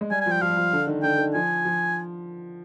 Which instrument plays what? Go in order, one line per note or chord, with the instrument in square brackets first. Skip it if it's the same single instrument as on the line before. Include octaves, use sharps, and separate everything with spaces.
[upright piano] G#3
[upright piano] G3 [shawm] G#5
[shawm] G#5
[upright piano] F3
[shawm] G5
[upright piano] F3 [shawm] F5
[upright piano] G3
F3
D3
D#3
[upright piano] D3 [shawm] G5
[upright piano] D#3
[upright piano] F3 [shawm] G#5
[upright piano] F3